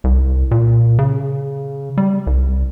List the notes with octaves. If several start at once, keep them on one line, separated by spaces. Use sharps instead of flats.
C2
A#2
C#3
G3
C2